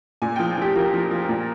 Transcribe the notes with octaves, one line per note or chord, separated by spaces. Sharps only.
A#2 G#5
F3 G5
F3 G4
F3 A#4
F3
F3
A#2